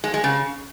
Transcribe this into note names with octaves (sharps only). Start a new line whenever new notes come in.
G#3
G#3
C#3